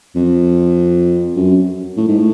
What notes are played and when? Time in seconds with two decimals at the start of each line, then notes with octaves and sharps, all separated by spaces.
0.16 F2
1.37 F#2
1.97 A2
2.08 G#2
2.19 A2